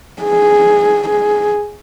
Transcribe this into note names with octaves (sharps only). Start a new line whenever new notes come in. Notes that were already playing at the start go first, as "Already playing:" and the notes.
G#4
G#4